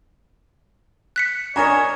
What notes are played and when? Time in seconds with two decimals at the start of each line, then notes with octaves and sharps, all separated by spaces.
1.16 F#6 B6 C#7
1.56 D4 D#4 A#4 C#5 G#5 A#5